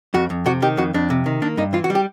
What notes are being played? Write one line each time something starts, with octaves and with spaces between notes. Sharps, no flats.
F2 F#4
F2
C3 F#4
D#3 G4
F2 F#4
F2 D4
C3
D#3
A#3 D4
G2 D#4
E3 F4
F#4
G3
G4